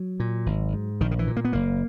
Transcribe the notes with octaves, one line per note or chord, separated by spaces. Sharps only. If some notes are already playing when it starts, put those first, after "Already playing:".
Already playing: F#3
A#2
G#1
G#2
A#1 D#3
D#3
E3
A#2
A#3
B3
F#1 A#3